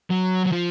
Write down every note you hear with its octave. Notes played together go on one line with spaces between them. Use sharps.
F#3
F#3
F3